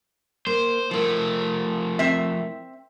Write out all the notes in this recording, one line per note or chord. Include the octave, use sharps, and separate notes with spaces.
A#3 C5
F3 A3 E4 A#4
C4 E5